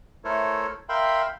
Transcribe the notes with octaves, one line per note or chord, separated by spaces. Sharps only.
A3 E4 A4 A#4 C5 C#5
A#4 E5 F5 G5 B5 C6